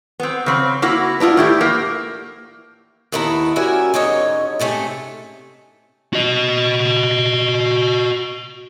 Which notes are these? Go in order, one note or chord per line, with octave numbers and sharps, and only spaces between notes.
B3 C4
C#3 C4
A#3 E4 F#4
B3 D4 E4 F4
A2 E4 G4
A#3
D#2 D#3 A3 B3 E4 A#5
G3 C#4 F#4 A#4 E5 G#5
G#2 D3 C#4 D#4 C#5 D#5
G#2 C3 A3 C#4
F#4 D#5